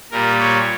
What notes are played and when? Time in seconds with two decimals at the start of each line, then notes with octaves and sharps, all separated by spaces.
0.11 A#2 G3 A#4
0.40 C#5